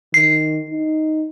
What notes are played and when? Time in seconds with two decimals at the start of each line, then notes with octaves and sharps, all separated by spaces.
0.14 D#3 C7
0.70 D#4